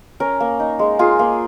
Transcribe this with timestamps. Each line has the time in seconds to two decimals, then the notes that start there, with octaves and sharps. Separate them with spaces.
0.20 C#4 A#4
0.40 A#3
0.60 D#4
0.79 G#3
0.99 F4 G#4
1.19 A#3